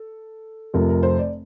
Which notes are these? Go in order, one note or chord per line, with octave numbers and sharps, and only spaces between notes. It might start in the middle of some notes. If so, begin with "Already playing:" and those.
Already playing: A4
F1 F2 C3 A#4
A#4
C5
D5